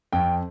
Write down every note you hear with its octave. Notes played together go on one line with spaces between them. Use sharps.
F2 G5